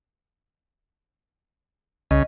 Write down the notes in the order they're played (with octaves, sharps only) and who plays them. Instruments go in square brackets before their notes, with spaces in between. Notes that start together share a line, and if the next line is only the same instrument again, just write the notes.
[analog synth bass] C2 [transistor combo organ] C#3 [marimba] D#5